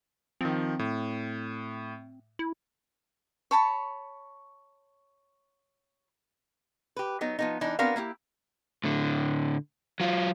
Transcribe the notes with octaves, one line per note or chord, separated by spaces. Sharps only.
D#3 F3 C4
A2
E4
C#5 A5 B5 C#6
G4 B4
F#3 B3 D#4
F3 B3 D#4
E3 D4 D#4
B3 C4 D4 F#4 A#4 F5
A#3 E4 F4 G4
A2 D3
F#3 F4